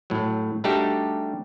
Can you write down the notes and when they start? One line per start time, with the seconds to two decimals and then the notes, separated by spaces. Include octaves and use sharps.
0.10 A2 F#3
0.64 G3 A3 D4 D#4 F#4 G4